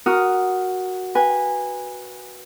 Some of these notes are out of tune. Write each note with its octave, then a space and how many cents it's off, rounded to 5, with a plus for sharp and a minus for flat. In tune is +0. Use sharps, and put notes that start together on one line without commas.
F#4 +0 A#4 +0 D#6 +0
B4 -10 G#5 -15